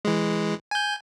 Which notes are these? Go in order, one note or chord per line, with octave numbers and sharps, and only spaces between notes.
E3 G#3
G#5 G6